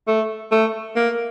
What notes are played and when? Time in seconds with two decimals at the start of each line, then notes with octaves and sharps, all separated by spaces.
0.07 A3
0.51 A3
0.96 A#3